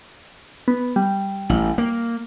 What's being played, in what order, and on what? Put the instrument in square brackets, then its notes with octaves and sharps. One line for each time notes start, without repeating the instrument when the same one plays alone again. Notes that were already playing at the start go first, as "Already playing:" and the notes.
[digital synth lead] B3
G3
[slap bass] A1
A#3